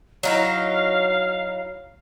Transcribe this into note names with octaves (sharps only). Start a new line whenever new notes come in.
F#3 D#4 E4 F5